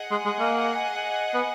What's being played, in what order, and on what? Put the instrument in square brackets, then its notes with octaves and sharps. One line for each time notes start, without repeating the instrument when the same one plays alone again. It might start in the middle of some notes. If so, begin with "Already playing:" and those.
Already playing: [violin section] G#4 D#5 F#5
[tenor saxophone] G#3
G#3
A#3
B3